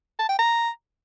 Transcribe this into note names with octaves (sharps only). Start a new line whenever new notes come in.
A5
G5
A#5